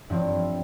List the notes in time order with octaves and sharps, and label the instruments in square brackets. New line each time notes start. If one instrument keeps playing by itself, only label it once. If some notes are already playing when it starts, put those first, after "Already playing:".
[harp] G2 F3 C4 E4